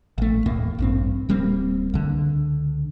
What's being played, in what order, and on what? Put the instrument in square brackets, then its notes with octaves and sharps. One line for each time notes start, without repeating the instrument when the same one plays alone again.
[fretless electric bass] A1 A3
E1 D#2 A2 A#3
A1 G2 C4
D1 G3 A#3 C4
C#2 D3